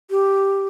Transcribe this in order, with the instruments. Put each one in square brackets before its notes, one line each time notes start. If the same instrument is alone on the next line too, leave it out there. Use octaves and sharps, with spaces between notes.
[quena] G4